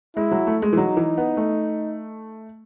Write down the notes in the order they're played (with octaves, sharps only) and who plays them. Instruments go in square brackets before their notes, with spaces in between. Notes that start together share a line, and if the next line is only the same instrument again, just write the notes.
[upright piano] G#3 [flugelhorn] E4
[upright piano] F#3
A3
G#3
E3
[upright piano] F#3 [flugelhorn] D#4
[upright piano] E3
B3
A3